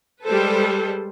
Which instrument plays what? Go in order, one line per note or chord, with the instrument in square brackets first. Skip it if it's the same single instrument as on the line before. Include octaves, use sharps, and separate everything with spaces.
[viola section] G3 G#3 A4 B4 C5